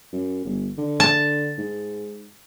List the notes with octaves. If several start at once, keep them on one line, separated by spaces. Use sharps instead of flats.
F#2
G1
D3
A5
G#2